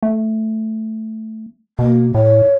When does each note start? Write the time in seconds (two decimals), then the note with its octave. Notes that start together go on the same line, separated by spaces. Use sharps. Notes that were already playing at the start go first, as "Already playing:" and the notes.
0.03 A3
1.79 B2 A#3
2.14 A2 C#5